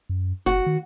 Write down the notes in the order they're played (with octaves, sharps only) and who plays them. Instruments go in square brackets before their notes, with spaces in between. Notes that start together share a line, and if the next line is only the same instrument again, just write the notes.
[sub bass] F#2
[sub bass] F#1 [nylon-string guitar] F#4
[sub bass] D#3